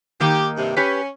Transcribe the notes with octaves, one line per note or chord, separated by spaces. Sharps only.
D#3 A#3 D#4 G4
G2 C3
C#4 G4 B4